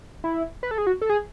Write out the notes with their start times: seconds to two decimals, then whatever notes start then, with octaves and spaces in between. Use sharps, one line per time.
0.24 E4
0.63 B4
0.71 A4
0.78 G#4
0.87 F#4
1.02 A4
1.10 G#4